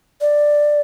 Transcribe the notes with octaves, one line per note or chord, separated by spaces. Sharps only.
D5